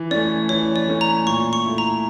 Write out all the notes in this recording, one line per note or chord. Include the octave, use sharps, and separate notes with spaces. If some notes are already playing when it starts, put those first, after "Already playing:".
Already playing: E3
A3 C#4 D5
E3 C#5
D5
A3 C#4
A#5
A#2 C#6
C#6
A3 E4
A#5